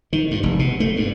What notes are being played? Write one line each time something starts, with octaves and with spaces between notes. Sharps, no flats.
D#3
G2
F1
B2
A3
G2